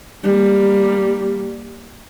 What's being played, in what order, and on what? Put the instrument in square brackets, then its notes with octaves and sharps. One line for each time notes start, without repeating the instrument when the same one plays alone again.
[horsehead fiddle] G3 A#3